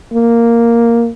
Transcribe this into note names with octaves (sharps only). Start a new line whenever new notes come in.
A#3